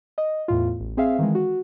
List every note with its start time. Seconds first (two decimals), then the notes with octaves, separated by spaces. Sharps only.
0.18 D#5
0.48 E2 A2 F4
0.80 A1
0.97 C4 G#4 E5 F5
1.19 D#3 E3 G#3
1.35 F#4